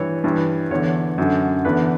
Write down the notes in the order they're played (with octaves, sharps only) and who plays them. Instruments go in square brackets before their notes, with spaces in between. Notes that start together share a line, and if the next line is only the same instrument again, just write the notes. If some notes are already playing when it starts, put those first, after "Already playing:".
Already playing: [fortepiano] G2 E3 C#5
G2 E3
E2 D3 C#5
F#2 D3
E2 D3 B4